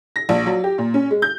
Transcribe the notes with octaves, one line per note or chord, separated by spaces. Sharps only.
A#6
A#1
F#3
G4
A#2
C#4
G#3
G6